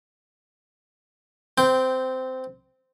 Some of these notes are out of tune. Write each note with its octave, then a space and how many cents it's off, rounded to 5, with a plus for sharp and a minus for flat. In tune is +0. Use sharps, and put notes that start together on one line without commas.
C4 -15 G5 +0